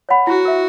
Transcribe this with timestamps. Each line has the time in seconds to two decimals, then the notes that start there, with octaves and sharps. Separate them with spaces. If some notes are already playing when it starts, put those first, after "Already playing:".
0.09 C#5 F#5 B5
0.27 E4 F#4
0.45 A#4 E5